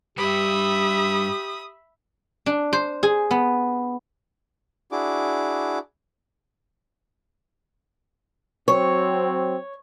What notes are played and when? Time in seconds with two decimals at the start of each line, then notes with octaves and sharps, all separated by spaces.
0.18 G2 G3 G4 B4 E5 B5 D#6
2.46 D4
2.73 C5
3.03 G#4
3.31 B3
4.92 D4 E4 F#4 G#4 D6
8.68 F#3 C4 C#5